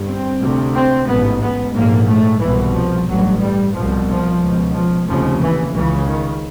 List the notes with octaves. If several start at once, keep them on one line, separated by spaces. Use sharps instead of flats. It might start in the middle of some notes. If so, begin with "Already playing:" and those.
Already playing: G1 G2
C4
D2 C3
C4
A1 G#2 B3
B3
A#1 G#2 A#3
A3
C2 B2 E3
F3
A1 G2 F#3
G3
C2 B2 F3
F3
C#2 B2
F3
F1 D#2 C#3 F3
E3
C#2 C#3 E3
D#3